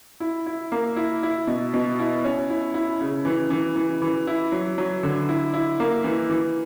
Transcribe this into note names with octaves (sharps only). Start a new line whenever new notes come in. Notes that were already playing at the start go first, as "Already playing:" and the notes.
E4
E4
A#3
E4
E4
B2
B2
E4
C#4
E4
E4
C#3
E3
E3
E3
E3
E4
F#3
F#3
D3
E4
E4
A#3
E3
E3